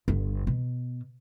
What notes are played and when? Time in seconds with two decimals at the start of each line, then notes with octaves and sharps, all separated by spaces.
0.08 G1
0.47 B2